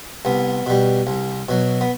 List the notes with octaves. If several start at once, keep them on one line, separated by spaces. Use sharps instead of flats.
C2 B3
B2 G3
C2
B2 F#3
B3